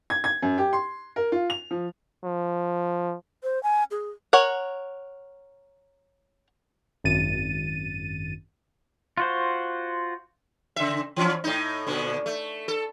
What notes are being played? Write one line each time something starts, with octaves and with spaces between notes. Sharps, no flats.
G#6
G#6
F#2
G4
C6
A#4
F4
F7
F3
F3
C5
G#5
G#4
A#4 C#5 F#5
G#1 F#2 A6 D#7
F4 F#4 C5
C#3 E5
E3 F3 C#4
A2 D#4
A#2 D3
A3
A4